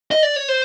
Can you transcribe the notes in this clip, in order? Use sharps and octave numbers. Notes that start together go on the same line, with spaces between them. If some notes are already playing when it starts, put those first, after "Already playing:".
D#5
D5
C#5
C5